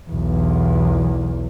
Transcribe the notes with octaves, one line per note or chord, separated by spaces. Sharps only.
B1 E2